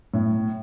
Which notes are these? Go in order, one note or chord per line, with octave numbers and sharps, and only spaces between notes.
A2